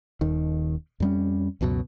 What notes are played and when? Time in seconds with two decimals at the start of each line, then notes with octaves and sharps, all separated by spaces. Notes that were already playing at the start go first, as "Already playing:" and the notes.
0.21 D#1 D#2 D#3
1.00 F2 G3 C#4
1.61 C#2 F#2 B2 F#3